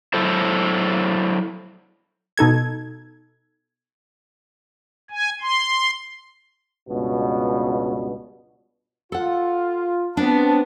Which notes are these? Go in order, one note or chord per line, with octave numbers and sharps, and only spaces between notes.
F#3 E4 A4 C5
B2 D#4 A4 G#6
G#5
C6
C#2 G2 B2
F4 A4 F#5
B3 C4 D4 A5